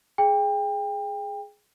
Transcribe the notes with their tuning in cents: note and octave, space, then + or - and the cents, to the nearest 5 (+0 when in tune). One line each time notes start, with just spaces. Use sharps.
G#4 +5 G5 +30